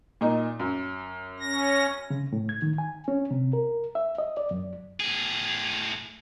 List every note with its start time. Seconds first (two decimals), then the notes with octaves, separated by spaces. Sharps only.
0.21 A#2 D#4
0.59 F#2
1.40 C#4 A#6
2.10 C#3
2.33 A2
2.49 G#6
2.62 D#3
2.78 G#5
3.08 C#4
3.31 C3
3.53 A#4
3.95 E5
4.18 D#5
4.37 D5
4.51 F#2
5.00 A2 G#4